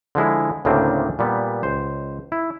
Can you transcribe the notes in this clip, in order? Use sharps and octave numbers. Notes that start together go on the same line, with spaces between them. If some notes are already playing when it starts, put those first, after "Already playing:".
D3 F3 G#3 E4
D2 A2 C#3 A#3 C4 D4
A#2 G3 B3
C#2 C5
E4